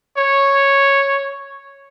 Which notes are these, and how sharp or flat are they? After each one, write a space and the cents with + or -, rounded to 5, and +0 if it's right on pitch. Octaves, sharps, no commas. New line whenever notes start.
C#5 -5